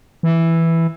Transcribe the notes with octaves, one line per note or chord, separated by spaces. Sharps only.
E3